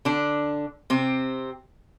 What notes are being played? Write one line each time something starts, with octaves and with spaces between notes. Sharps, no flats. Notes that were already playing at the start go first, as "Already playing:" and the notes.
D3 D4
C3 C4